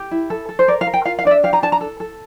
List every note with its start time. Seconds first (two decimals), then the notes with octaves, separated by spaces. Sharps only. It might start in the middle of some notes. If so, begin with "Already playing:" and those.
Already playing: G4
0.11 E4
0.30 A4
0.49 A4
0.59 C5
0.68 A#4 D5
0.81 F5
0.87 A#4
0.94 G5
1.05 F4 F5
1.19 F5
1.25 D4 D5
1.31 E5
1.43 G4 F5
1.53 A#5
1.62 D4 A5
1.72 A#5
1.81 A4
2.00 A4